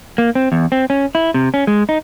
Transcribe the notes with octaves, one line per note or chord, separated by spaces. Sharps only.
A#3
C4
E2
C4
C#4
E4
C3
C#4
G#3
D#4